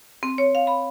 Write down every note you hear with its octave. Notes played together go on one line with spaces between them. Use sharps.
C4
C#5
F5
B5